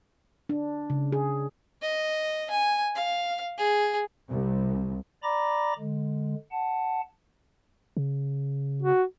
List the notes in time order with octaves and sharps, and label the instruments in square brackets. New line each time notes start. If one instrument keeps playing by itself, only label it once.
[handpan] D4
C#3
G#4
[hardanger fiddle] D#5
G#5
F5
G#4
[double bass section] C2
[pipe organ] D5 A#5 B5 D6 A#6
D3 G#3
F#5 A5
[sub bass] C#3
[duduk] F#4